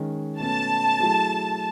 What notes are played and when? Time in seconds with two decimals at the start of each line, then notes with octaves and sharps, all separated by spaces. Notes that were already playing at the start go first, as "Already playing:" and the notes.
Already playing: D#3 G#3 C#4
0.39 B2 A3 C#4 A5
1.00 F#3 A3 E4 G#4